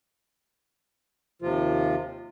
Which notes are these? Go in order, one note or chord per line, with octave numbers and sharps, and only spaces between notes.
D#2 C3 F3 F4